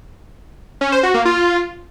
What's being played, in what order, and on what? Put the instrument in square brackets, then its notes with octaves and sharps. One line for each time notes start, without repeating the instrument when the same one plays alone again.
[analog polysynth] C#4
C5
F#4
A#3
F4